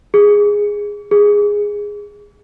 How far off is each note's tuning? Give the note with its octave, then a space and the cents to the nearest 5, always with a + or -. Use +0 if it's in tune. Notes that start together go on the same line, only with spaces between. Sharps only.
G#4 -10
G#4 -10